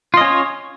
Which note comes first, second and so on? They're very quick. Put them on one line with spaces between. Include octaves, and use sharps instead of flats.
F4 D#5 C#4 C#5